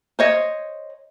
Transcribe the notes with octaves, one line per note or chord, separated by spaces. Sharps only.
C5 C#5 D#5